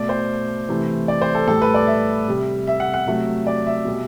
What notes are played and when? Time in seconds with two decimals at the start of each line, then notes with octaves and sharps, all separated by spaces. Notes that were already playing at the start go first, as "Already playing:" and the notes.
Already playing: B2 A3 D5
0.09 C5
0.69 C3 E3 A3
1.08 D5
1.22 C5
1.35 A4
1.48 A2 G3 A4
1.62 B4
1.74 D5
1.87 E5
2.28 C3 G3
2.67 E5
2.80 F#5
2.94 F#5
3.07 C3 F#3 A3 E5
3.47 D5
3.66 E5
3.85 B2 G3